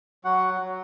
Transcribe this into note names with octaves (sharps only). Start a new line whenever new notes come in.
F#3 F#4 F#5
F#3